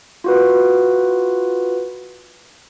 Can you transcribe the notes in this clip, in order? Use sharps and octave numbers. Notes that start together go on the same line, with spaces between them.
F4 F#4 B4